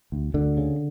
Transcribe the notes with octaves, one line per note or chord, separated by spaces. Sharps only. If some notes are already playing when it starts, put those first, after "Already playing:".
D2
D2 D3
C#3